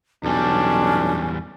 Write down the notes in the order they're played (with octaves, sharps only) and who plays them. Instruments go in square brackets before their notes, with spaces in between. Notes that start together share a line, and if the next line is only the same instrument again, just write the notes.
[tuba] B1 [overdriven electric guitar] E2 G3 [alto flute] C#4 [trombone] D4